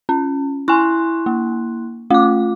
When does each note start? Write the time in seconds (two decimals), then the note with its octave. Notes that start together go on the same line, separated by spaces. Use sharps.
0.09 C#4
0.68 E4 G#5 C6 C#6 F#6
1.26 A#3
2.10 A3 F4 D6